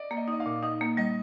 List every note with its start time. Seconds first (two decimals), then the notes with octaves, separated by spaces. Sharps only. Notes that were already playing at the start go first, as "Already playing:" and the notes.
Already playing: D5 D#5
0.11 A#3
0.17 D#5
0.28 D#4 D#5
0.40 F5
0.46 A#2
0.63 D#4 D#5
0.81 A#3
0.97 G3 D#5